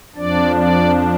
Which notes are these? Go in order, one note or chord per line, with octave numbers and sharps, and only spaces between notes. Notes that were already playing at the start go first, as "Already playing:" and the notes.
F2 F3 D4 D5
D5